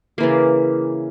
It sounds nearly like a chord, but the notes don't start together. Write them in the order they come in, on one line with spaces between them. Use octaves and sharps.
A#3 E3 C#3